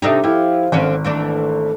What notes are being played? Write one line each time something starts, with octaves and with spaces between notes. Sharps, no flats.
C3 D4 D#4 G4 A4 E5
F3 E4 G4 A4
G#1 D3 C4 C#4
E3 A3 D4